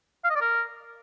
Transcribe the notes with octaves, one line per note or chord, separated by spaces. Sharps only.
F5
D#5
D5
A#4